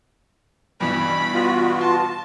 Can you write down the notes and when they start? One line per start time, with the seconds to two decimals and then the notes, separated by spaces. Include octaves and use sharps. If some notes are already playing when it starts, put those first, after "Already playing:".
0.80 G2 B2 E3 B5
1.34 B3 F4 F#4
1.81 A5 C6